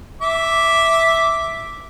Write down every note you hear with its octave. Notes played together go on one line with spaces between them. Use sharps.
E5 D6